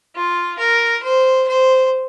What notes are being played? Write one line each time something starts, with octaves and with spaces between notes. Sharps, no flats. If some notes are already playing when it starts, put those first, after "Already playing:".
F4
A#4
C5
C5